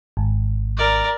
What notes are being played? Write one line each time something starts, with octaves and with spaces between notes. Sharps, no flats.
G#1
A#4 D5